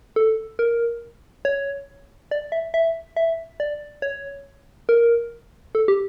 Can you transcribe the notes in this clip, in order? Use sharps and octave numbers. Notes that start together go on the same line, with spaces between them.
A4
A#4
C#5
D5
E5
E5
E5
D5
C#5
A#4
A4
G4